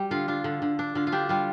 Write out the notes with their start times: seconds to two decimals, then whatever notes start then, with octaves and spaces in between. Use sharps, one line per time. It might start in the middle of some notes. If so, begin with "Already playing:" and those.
Already playing: G3
0.11 D3 F4
0.28 D4 F4
0.44 D3
0.62 D3
0.79 D4
0.95 D3 F4
1.07 F4
1.12 D4 G4
1.29 G3 F4